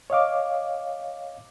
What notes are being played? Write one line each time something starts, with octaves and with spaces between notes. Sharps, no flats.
C#5 D#5 F5 D6